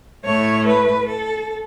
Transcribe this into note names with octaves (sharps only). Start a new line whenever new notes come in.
A2 A3 C#5
B4
A4